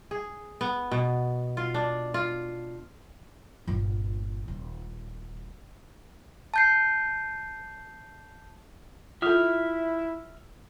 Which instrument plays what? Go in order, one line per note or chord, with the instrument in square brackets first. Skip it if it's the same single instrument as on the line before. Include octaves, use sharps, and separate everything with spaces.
[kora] G#4
B3
B2
F4
D4
F4
[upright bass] G1 A#2
D#1
[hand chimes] A5 G6 C7
[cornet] E4 [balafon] F4 A4 [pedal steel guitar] E5 F6